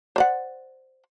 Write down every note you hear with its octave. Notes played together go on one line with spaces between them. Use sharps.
C5 D5 F#5